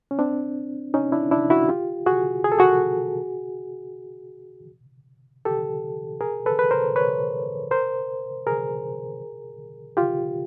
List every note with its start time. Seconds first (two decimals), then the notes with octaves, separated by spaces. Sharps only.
0.11 C#4
0.19 C4 D4
0.94 C#4 D#4
1.12 D4 E4
1.31 D4 E4
1.50 E4 F#4
1.69 F4 G4
2.06 F#4 G#4
2.44 G#4
2.52 A4
2.59 F#4 G#4
5.45 G4 A4
6.21 G#4 A#4
6.46 A4 B4
6.59 B4
6.71 A#4 C5
6.96 B4 C#5
7.71 A#4 C5
8.47 G#4 A#4
9.97 F4 G4